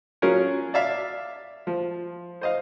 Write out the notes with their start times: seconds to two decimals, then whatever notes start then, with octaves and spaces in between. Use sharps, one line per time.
0.22 F#3 C#4 F4 G#4 A#4 C#5
0.74 D5 E5 F5
1.67 F3
2.41 C5 D#5 F5